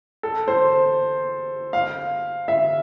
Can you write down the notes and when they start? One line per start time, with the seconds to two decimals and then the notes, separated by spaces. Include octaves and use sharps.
0.23 A4
0.48 C5
1.73 F5
2.48 E5